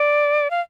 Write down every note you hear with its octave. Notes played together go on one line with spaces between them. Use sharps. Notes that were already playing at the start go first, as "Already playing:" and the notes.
Already playing: D5
F5